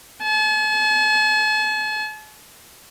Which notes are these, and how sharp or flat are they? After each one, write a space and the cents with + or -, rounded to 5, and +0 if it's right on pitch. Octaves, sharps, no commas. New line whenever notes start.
A5 -45